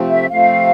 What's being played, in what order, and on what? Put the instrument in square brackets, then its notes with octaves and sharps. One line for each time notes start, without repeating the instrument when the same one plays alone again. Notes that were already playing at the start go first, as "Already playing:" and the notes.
Already playing: [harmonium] C3 F3 A3 C4
[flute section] E5
[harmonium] C3 F3 A3 C4 [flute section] F5